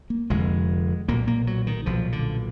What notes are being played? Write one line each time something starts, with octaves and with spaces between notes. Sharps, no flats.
A#3
F1 F2 D3 G#3
B1 A#2 A#3
A#3
F#3
D#3
B1 A#2 F3
D3